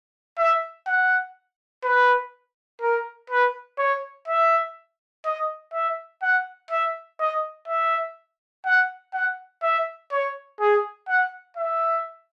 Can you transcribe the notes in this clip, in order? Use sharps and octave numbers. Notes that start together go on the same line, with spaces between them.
E5
F#5
B4
A#4
B4
C#5
E5
D#5
E5
F#5
E5
D#5
E5
F#5
F#5
E5
C#5
G#4
F#5
E5